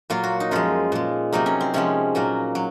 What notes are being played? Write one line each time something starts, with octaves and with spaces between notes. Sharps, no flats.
A#2 F#3 A#3 F4
F#4
D#4
F#2 F3 G#3 F4
A#2 G#3
C3 F#3 A#3 D#4
C#4
C4
C3 F3 G#3 C#4
A#2 F#3 A#3
F#3